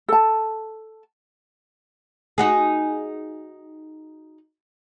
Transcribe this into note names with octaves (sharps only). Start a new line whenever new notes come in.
A4 A5
D#4 F#4 G#4